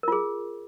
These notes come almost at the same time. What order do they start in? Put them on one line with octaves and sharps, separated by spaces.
A#4 F4 G#4